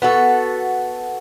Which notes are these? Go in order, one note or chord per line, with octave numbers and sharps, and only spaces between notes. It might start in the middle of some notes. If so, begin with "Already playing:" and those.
B3 F#4 A4